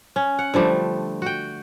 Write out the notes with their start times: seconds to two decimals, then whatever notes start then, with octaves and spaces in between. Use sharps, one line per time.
0.16 C#4
0.39 F#5
0.54 D3 F3 G3 A3
1.22 F#4 G5